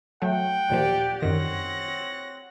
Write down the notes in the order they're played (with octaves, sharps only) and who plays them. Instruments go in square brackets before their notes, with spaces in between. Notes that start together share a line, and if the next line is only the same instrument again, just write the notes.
[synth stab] F#3 A3 [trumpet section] F#5 G5
[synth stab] D#2 A#2 F3 [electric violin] G4 D5
[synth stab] F#2 D#3 [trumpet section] C4 C#5 F#5 [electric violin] A#6